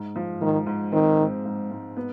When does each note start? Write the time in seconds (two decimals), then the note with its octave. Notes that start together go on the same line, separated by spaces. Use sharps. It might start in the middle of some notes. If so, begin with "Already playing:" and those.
Already playing: G#2
0.16 F3
0.42 G#2 D#3
0.67 G#2
0.92 D#3 C4
1.19 G#2
1.45 G#2
1.71 G#2
1.97 B3